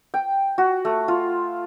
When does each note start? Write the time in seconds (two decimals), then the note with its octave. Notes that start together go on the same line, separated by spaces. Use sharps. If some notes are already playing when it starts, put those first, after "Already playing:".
0.14 G5
0.58 F#4
0.85 A3
1.08 F4